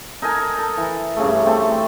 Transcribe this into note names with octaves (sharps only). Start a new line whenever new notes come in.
D#4 A4 A#4 G#5
A4
E3
G2 C#3 A3
A3 C4 G4 A4